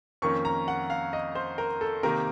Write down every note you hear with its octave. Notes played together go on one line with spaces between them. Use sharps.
F2 D#3 A#3 C#4 C#6
A#5
F#5
F5
D#5
C5
A#4
A4
C3 D#3 A#3 A#4